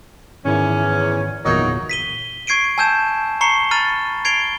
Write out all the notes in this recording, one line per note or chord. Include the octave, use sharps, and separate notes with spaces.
E2 G#2 D#3 C#4 E4
G1 E2 A#2 F#3 A#3 D#4
B6 D#7 G7
C#6 G#6 C7 D7 D#7
G#5 A5 E6 G6 G#6 E7
A#5 C#6 C7 C#7 G7
A#5 B5 F6 A6 D#7
G#6 C7 D7 F7 G7